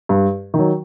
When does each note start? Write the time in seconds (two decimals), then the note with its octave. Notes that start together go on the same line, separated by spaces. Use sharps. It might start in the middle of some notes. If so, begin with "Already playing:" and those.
0.09 G2
0.54 D#3 F#3